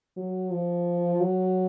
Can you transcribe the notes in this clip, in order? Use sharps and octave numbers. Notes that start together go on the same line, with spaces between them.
F#3
F3
F#3